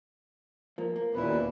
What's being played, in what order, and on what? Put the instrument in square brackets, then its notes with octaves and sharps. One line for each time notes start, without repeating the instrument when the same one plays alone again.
[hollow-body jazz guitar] F3 A#3
A#3
[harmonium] D#2 A#2 B4 [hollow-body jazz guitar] B3 C#4 E4